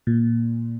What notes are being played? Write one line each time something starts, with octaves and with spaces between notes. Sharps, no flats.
A#2